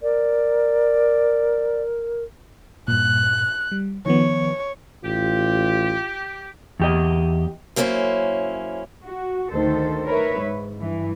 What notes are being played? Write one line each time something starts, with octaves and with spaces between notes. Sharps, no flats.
A#4 D5
G2 A#2 F#6
G3
D#3 F3 B3 C#5
A1 F4 G4
E2 G4 D#5
F#2 A#3 C#4 D4 E4 C5
F#4
D2 D#3 A4 C5
A#4 B4 C#5 E5
G#2
G2 E3